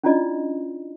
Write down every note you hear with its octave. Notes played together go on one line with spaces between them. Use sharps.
C#4 D4 E4 F4 D5 D#5